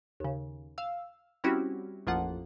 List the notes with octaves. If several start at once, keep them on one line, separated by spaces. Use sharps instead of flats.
D#2 C#3
F5 E6
G3 C4 C#4 E4 F#4 G4
A1 F2 F3 A#3 F4 F#5